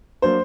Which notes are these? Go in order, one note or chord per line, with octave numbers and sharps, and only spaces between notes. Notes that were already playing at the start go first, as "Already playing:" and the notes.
F#3 A#3 D4 C5